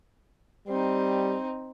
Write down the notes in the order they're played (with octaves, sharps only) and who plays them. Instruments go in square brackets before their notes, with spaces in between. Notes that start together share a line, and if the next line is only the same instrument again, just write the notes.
[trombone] G3 [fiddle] C4 D#4